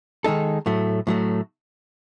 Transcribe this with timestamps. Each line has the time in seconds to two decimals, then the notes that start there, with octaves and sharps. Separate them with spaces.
0.24 D#3 G#3 D#4 A4
0.66 A2 F#3 A3
1.07 A2 F#3 A3